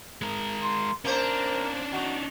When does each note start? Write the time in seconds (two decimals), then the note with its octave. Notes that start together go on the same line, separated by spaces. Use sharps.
0.22 G#3 A#4
0.61 C6
1.05 A#3 C#4 D4 A#4 C5
1.92 D#3 F#4